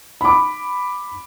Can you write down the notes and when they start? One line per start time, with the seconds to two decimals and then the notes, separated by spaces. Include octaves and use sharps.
0.21 B5 D6